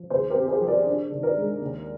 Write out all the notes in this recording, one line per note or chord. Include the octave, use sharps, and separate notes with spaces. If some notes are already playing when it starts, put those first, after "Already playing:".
Already playing: F3
D#2 G#4 C5
G4 A#4
C4
G#4 C5
F3
A#4 D5
D4
D#3
A#4 D5
G#3
D#2